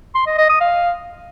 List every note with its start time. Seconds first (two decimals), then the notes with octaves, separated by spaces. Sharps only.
0.15 C6
0.27 D#5
0.38 D#5
0.49 D#6
0.61 F5